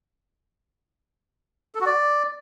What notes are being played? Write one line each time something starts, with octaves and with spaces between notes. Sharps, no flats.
A4
F#4
D5